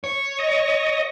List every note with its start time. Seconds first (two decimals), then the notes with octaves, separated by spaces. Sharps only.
0.04 C#5
0.39 D#5